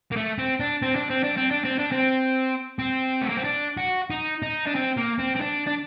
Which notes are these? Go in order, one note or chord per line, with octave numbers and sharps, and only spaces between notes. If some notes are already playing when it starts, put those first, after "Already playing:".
A#3
A3
C4
D4
C4
D4
C4
D4
C4
D4
C4
D4
C4
C4
A3
A#3
C4
D4
F#4
D#4
D#4
D4
C4
A#3
C4
C4
D4
D4